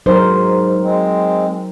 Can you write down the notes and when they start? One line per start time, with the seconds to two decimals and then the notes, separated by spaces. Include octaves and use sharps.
0.06 G#2 F#3 D#4 A#4 C5
0.83 G#3 C4